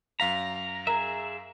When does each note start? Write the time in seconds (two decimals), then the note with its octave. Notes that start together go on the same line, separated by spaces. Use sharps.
0.20 F#2 F5 A#5 B6
0.87 G#4 A#4 E5 A#5